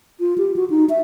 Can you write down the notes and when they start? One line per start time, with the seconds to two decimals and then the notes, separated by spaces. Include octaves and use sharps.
0.20 F4
0.38 G4
0.56 F#4
0.70 D#4
0.90 E5